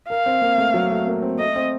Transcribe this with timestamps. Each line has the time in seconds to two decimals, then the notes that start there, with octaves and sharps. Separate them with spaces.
0.10 A#4 F5
0.26 C4
0.42 A#3
0.58 A3
0.74 F#3
0.90 A3
1.07 A#3
1.22 C4
1.39 A3 D#5
1.56 C4